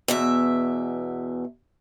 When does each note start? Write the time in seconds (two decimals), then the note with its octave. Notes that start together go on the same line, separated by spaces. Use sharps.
0.08 E2 B2 E5